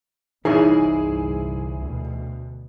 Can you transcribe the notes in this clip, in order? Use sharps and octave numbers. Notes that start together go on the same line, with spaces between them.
G1 C2 E3 D#4 E4 G#4 C#5
D2 B2